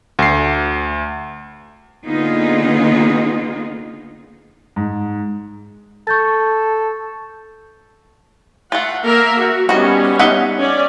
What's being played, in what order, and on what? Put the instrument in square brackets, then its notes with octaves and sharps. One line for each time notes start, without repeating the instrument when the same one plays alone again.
[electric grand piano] D2 C7
[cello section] D3 A#3 B3 D#4 F4 G#4
[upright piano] G#2
[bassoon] A4 [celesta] C#6 G6 A6
[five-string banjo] A3 F4 [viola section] F#5
[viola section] A#3 A#4 E5
F#4
[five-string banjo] D#3 F#4 [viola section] G3 B3 C#4
[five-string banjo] D#4 E5 F#5
[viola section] C#4 D5